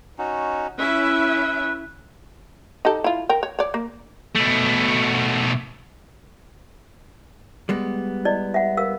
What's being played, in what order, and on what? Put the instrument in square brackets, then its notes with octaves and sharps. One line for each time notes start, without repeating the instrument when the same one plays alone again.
[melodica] C#4 D#4 F#4
[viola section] C#4 E4 E5 [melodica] B4
[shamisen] D#4 G4 A4
E4 F4
A#4 G5
C#5
C#5 D5
A#3
[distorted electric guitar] B2 A3
[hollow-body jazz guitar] G3 G#3 B3
[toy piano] E4 D5 D#5
E5 F#5
A#4 F5 E6